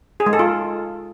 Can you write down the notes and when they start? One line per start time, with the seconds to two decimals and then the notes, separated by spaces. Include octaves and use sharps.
0.20 G#4
0.26 G#3
0.33 A4
0.39 F4